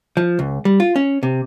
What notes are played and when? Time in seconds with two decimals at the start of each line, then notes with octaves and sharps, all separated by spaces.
0.17 F3
0.39 C#2
0.65 G3
0.80 F4
0.96 C#4
1.23 C3